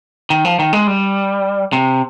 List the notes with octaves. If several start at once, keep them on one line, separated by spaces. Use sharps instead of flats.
D#3
F3
D#3
G#3
G3
C3